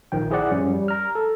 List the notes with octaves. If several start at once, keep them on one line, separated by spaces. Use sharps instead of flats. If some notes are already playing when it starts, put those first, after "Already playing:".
A#1 D#3 F3 G5
E4 G#4 C5 D5 F#5
F#2 F3 G3 C#4
G3
A#5 F6
A4